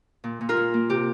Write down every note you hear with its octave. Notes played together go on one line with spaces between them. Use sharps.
A#2
A#2
F4 A#4
A#2
A#3
C3 G4